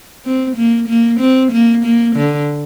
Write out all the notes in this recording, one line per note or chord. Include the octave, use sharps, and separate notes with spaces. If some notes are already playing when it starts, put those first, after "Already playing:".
C4
A#3
A#3
C4
A#3
A#3
D3